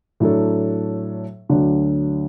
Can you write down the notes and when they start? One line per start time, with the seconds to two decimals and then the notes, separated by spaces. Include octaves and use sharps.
0.20 A2 F#3 D4 A4
1.49 D2 D3 F#3 D4